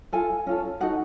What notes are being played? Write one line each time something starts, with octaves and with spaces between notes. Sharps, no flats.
F4 A4 G#5
C#4 F4 A4
D#4 F#4 A4 F#5